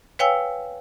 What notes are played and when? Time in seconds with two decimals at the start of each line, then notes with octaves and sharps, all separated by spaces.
0.19 B4 C#5 F5 G5 G#5 E6